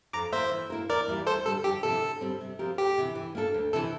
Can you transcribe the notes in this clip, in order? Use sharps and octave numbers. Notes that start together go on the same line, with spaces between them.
F2 A#5 D6
E3 A#3 C5 E5
E3
A#3 E4 A#4
E2 A#4 D5
E3 G3 A#3 E4
D2 A4 C5
D3 G3 A4
F2 G4
C3 F3 A#3 E4 A4
D3
G3 C4
C3
F3 C4 G4 A#4
D2 G4
C3 E3
E3
A#3 D4 A4
D2
C3 E3 A4